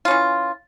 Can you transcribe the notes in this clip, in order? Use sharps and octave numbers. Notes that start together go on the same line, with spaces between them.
E3 C#4 F4